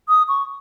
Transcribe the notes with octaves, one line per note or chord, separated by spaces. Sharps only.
D#6
C#6